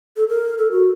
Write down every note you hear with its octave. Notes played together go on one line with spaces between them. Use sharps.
A4
A#4
A4
F#4